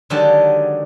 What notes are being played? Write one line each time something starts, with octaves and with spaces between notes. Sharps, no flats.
D3 D#3 F#3 G#3 G4 A5